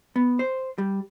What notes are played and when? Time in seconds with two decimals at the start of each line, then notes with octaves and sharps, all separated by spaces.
0.16 B3
0.39 C5
0.78 G3